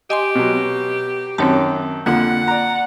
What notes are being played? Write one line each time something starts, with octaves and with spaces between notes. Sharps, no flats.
G4 D#5 G#5 C6
B2 F#3
F#2 D#3 F#3 C4 C#5 A5
F2 D3 A#3 F4 F#5 F#6
D5 A#5